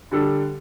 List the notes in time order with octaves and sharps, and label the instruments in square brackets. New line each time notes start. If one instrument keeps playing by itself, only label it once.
[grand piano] D3 G3 D4 A4